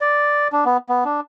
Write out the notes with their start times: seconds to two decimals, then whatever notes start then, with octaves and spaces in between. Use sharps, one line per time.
0.01 D5
0.52 D4
0.65 B3
0.89 B3
1.05 D4